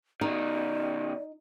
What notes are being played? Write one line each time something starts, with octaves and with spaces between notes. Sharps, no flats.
B2 D#3 D#4 D5